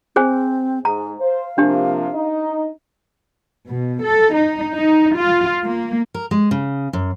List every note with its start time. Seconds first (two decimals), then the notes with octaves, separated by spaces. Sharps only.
0.16 C4 G#4 C5 G#5
0.85 G#2 G#4 A#5
1.20 C5 F5
1.58 C3 F3 A#3 D4 G4
2.14 D#4 D#5
3.68 B2
4.03 A4
4.35 D#4
4.75 D#4
5.15 F4
5.64 A#3
6.14 A#4
6.31 G#3
6.51 C#3
6.93 F#2